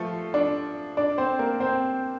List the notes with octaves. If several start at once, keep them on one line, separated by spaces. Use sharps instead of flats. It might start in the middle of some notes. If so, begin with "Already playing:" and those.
Already playing: F3 A3 F4 A4
D4 D5
D4 D5
C4 C5
A#3 A#4
C4 C5